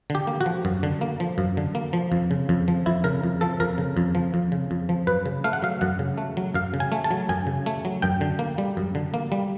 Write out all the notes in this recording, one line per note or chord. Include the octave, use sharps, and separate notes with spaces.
D3 G4
A#3
F#4
F3
F#2
D3
A#3
F3
F#2
D3
A#3
F3
F2
C#3
F2
F3
F2 E4
C#3 A#4
F2
F3 A4
F2 A#4
C#3
F2
F3
F2
C#3
F2
F3
F#2 B4
C#3
A3 F5
F#5
F#3 F5
F#2 F#5
C#3
A3
F#3
F#2 F5
C#3
G#5
A3
A5
F#3
F#2 G#5
C#3
A3
F#3
F#2 G5
D3
A#3
G3
F#2
D3
A#3
G3